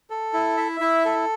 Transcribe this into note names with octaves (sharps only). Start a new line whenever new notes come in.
A4
E4
E5
E4
A4